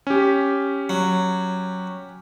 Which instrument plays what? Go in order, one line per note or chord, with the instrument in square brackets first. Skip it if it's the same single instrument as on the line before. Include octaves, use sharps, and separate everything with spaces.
[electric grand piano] C#4 G4
[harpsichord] F#3